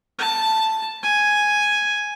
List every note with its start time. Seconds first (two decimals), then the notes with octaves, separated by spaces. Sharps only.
0.18 A5
1.03 G#5